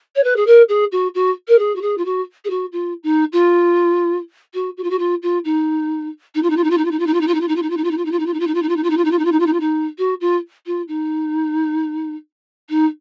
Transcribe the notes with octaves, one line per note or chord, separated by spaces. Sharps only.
C#5
B4
G#4
A#4
G#4
F#4
F#4
A#4
G#4
F#4
G#4
F4
F#4
G#4
F#4
F4
D#4
F4
F#4
F#4
F4
F#4
F4
F4
D#4
D#4
F4
D#4
F4
D#4
F4
D#4
F4
D#4
F4
D#4
F4
D#4
F4
D#4
F4
D#4
F4
D#4
F4
D#4
F4
D#4
F4
D#4
F4
D#4
F4
D#4
F4
D#4
F4
D#4
F4
D#4
F4
D#4
F4
D#4
F4
D#4
F4
D#4
F4
D#4
F4
D#4
F#4
F4
F4
D#4
D#4